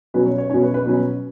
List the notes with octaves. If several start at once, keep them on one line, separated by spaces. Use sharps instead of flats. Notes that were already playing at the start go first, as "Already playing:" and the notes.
B2 F#3 C#4 B4
C#5
C#5
B2 F#3 C#4 C#5
B4
B4
B2 F#3 C#4